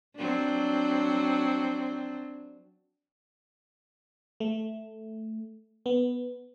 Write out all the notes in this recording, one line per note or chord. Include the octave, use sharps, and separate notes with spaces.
F#3 C4 D4
A3
B3